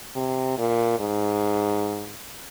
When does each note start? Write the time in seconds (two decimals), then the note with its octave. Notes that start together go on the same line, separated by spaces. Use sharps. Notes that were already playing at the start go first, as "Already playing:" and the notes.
0.16 C3
0.58 A#2
0.99 G#2